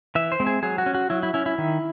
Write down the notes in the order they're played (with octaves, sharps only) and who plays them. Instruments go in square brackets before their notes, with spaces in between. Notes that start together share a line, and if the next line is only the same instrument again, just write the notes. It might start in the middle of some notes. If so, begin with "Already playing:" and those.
[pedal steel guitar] E3 E5
C5
G#3 C4
G#4
F#3 G#4
F#4
C#4
F#4
F#3 E4
E4
C#4 E4
E4
D#3